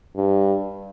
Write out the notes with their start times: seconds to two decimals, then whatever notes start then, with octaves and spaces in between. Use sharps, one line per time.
0.16 G2